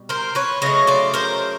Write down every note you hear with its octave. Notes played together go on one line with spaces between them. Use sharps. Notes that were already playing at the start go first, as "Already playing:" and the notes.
Already playing: B2 G3
A#4 C5
B4 C#5
C#3 F#3 A3 C#5 D#5
C5 D5
A#4 C5